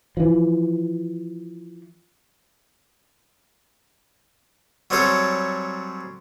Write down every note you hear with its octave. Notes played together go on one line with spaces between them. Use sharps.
E3 F3
F#3 G3 C4 G#4 A4 C#5